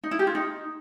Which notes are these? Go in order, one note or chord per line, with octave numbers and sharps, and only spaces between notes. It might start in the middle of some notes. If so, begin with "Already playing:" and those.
D#4
E4
G4
F4
D#4